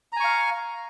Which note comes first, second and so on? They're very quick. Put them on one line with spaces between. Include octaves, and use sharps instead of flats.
A#5 G#5 C#6 F5